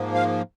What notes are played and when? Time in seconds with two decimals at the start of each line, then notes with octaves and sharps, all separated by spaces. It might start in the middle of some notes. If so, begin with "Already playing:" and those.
Already playing: G#2 F3 A#3
0.14 F5